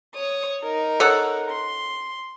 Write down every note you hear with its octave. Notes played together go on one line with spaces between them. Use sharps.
C#5 D#6
D#4 A#4
A4 C#5 F#5
C6